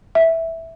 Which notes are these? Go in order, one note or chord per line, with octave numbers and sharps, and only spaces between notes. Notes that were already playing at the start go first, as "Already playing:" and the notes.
E5